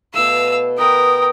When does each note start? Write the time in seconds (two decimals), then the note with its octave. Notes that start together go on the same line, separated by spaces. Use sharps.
0.14 B2 A3 F5 E6
0.78 A#4 B4 F#5 G5 D#6